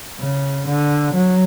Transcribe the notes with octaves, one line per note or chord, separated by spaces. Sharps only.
C#3
D3
F#3